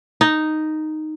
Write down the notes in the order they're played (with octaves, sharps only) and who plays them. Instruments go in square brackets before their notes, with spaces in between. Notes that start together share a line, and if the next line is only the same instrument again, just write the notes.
[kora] D#4